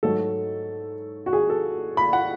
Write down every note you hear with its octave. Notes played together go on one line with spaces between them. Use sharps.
G#2 F#3 A3 A4
F#4
G#4
A4
B5
F#5